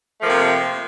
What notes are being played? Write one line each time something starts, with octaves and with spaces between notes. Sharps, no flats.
C3 F3 A3 A#3